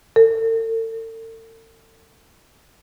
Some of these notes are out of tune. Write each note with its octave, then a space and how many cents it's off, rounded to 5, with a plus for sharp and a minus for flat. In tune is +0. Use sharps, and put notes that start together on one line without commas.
A4 +40